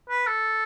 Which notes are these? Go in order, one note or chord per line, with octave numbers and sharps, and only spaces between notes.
B4
A4